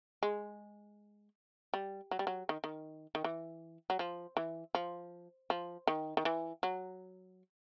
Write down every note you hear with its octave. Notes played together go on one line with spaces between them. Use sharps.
G#3
G3
F#3
G3
F#3
D#3
D#3
D#3
E3
F#3
F3
E3
F3
F3
D#3
D#3
E3
F#3